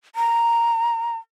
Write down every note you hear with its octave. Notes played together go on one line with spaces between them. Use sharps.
A#5